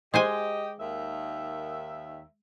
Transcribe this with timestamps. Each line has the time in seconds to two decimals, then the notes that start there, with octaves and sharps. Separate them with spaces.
0.14 G#3 G4 C5 D#5 G#5
0.79 D#2 D#3 E5